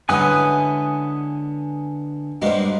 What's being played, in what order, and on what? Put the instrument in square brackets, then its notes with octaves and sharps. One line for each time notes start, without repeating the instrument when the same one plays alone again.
[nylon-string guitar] D3 G#3 E4 [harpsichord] B3 C#4 [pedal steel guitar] G#5 D#6 F#6
[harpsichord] G2 G#3 A#3 [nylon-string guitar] F#4 C5